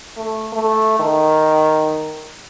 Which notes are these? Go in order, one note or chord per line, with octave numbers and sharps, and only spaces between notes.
A3
A3
D#3